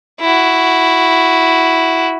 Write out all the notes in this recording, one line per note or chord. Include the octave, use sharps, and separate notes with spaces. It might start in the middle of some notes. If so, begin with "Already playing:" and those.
E4 F#4